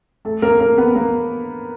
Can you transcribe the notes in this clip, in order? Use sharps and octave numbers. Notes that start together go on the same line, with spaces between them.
A3 A4
A#3 A#4
A#3 A#4
B3 B4
A#3 A#4